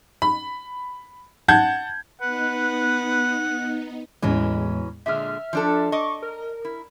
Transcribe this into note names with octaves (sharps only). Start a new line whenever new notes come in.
B5
F#5 A5 G6 G#6
B3 D#4 B4 F#5
E2 A2 E3 F#3 G#3 C#4
A#2 D3 G#3 E5 F6
F3 D4 A4
D#5 C#6 D6
A#4
E4